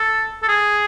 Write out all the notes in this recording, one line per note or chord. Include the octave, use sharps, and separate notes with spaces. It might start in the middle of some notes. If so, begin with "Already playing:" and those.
Already playing: A4
A4
G#4